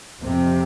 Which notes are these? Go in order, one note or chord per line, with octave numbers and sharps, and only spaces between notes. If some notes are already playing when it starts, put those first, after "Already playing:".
F2 C3